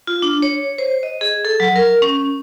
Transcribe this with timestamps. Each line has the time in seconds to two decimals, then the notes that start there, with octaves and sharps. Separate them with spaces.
0.07 F4
0.22 D4
0.42 C#5
0.78 C5
1.03 D#5
1.21 G#4
1.45 A4
1.60 F#3
1.76 A#4
2.02 C#4